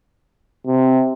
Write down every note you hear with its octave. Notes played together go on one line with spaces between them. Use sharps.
C3